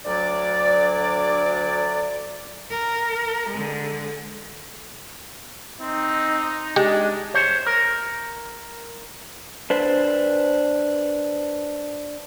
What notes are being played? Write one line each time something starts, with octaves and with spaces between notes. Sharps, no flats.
D2 F#3 D5
A#4
D3 G#3
C4 D#4
G#3 D4 G4
C5 C#5
A#4
D4 B4 C5